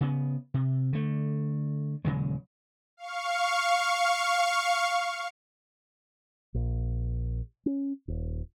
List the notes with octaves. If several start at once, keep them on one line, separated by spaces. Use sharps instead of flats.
C#3 B3
C3
D3 A3
D#1 C#3 F#3 G#3
F5 C#6
A#1
C#4
D#1